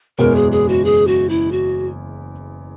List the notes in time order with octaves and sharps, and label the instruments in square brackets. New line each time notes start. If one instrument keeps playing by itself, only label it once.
[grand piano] F#1 E2 B2 G#3 C#4 [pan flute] A#4
[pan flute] G#4
G#4
F#4
G#4
F#4
E4
F#4